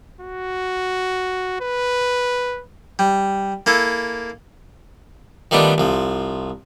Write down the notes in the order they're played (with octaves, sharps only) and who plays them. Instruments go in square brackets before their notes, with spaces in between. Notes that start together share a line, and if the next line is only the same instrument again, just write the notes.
[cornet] F#4
B4
[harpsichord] G3
A#3 E4 A4
D#3 F3 G3 A3 B3 D4
C2 F3